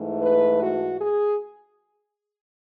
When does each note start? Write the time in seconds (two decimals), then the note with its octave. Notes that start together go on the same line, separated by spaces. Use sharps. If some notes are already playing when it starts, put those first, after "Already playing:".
Already playing: G#2 E3 A3
0.22 B4
0.61 F#4
1.01 G#4